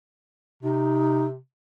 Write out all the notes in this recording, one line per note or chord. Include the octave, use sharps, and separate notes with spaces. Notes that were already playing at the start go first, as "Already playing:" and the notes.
C3 D#4